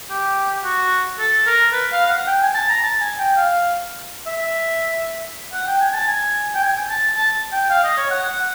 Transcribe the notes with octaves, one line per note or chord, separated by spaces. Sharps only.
G4
F#4
A4
A#4
B4
F5
F5
F#5
G5
G#5
A5
A#5
A5
G#5
G5
F5
E5
F#5
G5
G#5
A5
G#5
G5
G#5
A5
A5
G5
F5
D#5
C#5
F#5
F#5